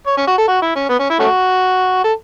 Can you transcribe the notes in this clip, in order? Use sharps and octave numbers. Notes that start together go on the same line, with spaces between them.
C#5
C#4
F#4
A4
F#4
E4
C#4
B3
C#4
E4
A3 C#4 F#4
A4